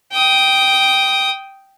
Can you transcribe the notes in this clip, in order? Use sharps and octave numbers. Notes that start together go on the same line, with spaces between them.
G5 D#6